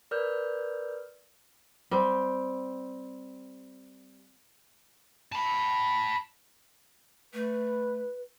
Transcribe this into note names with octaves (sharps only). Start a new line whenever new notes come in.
A#4 B4 D5 F6 G6
G3 C4
A5 B5
A3 B4